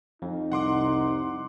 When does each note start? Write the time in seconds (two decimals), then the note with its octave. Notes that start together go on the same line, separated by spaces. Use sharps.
0.22 F2 D#4
0.52 C2 F#5 C6 D6